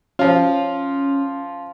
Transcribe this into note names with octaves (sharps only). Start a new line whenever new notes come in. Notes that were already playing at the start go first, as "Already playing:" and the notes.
F3 C#4 F4